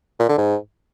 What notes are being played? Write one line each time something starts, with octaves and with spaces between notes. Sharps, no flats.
A#2
D3
G#2